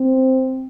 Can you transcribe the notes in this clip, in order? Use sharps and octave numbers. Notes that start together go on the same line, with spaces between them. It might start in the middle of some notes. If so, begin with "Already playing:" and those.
Already playing: C4